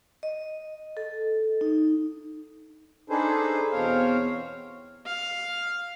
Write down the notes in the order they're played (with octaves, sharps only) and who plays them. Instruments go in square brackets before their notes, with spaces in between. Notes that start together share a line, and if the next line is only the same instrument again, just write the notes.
[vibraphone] D#5
A4
D#4
[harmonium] D4 D#4 G#4 A4 B4 C5
E2 B2 C4 C5 C#5 F5
[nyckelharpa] F5